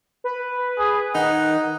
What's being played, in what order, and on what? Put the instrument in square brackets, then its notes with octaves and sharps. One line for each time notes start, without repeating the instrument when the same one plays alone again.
[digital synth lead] B4
[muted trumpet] G#4
[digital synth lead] D#3 [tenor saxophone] D#4 [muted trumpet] F#5